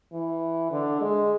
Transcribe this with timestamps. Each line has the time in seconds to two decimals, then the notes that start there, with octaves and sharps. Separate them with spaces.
0.12 E3
0.71 D3
1.00 G#3